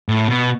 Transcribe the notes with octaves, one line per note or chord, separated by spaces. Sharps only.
A2
B2